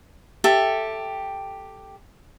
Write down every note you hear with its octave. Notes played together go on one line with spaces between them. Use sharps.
G4 A4 E5